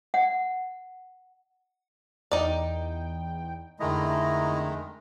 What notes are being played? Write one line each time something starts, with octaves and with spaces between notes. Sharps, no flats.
F#5
E2 D#4 D5 G5
F2 D3 D#3 G#3 A3 E4 D#5 A#5